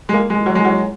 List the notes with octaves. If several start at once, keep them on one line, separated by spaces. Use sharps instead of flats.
G#3
A#3
G#3
F#3
G#3
F#3